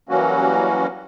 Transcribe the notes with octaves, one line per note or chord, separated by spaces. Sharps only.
E3 F#3 G3 A#3 C#4 F#4